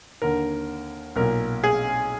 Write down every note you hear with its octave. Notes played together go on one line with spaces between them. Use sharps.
D#2 D3 A#4
B1 A#2 A#4
G#4